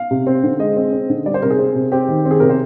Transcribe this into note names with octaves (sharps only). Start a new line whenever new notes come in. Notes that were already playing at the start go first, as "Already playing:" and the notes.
Already playing: F5
C3
C4
D3
G#3 D#5
C4
C4
D3
G3 D5
C5
C3 A#4
G#4
C4
C3
C4 G4
D#3
C4
G#4
C3 A#4
C5